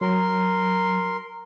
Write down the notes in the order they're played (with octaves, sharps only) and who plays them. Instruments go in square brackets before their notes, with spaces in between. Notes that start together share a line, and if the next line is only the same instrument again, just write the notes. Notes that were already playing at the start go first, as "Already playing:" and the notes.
[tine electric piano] F#3 [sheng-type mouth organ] A#4 C6